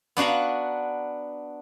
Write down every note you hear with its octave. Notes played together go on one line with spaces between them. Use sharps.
B3 D4 F#4 F5 A#5